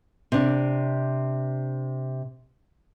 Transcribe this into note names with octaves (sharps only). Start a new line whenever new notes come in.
C3 D4